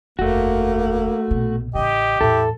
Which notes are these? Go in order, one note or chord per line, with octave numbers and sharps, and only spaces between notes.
F1 D#2 A3 A#3 F#4
A#1 B2
A1 C#3 G4 D#5
E2 A2 E4 A4